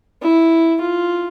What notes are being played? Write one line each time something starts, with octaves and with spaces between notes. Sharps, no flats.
E4
F4